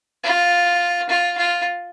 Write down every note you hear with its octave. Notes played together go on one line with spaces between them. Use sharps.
F4
F4
F4